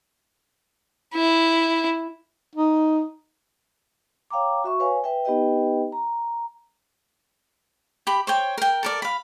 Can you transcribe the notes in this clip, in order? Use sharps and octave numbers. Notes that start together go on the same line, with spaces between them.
E4
D#4
C#5 F5 G5 A#5 D6
F#4 E5 C#6
B4 C#5 F5 G#5
B4 E5 G5
B3 D#4 G4 B4 D#5 G5
A#5
G4 B5
C5 C#5 G5
A#4 G5
A4 A#4 D5
F5 B5